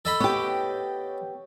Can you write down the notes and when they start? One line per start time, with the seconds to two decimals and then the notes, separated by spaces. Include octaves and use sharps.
0.05 A4 D#5 B5
0.20 B3 G4 C#5 G5